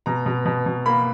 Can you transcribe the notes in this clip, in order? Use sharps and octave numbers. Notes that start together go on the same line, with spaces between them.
B2 A#5
B2
B2
B2
A#3 B5